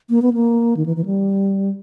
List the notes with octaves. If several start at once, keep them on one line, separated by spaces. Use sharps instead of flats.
A#3
B3
A#3
D#3
E3
E3
G3